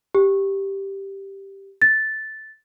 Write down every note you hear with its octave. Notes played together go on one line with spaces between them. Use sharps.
G4
A6